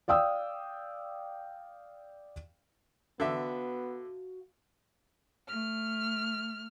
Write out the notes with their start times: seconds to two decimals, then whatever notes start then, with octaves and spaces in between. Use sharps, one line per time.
0.08 D5 F5 G5 D#6 E6
3.20 D3 B3 F#4 E5 F5
5.48 A3 F6